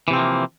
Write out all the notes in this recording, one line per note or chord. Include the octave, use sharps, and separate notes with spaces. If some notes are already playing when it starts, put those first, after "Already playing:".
C3 E3 F3 A#3 C4